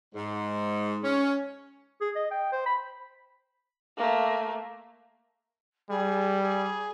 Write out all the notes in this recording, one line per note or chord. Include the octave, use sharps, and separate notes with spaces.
G#2
C#4
G#4
D#5
G5
C5
B5
A3 A#3
G3 G#4
G#4